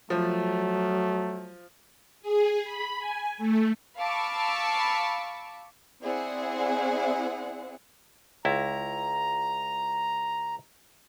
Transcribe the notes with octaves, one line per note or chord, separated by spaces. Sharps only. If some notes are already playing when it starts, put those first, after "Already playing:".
F3 F#3 A3
G#4
B5
G#5
A3
F5 A5 B5 C#6 D6 E6
C4 E4 G#4 C5 D5 F#5
C#2 E4 A#5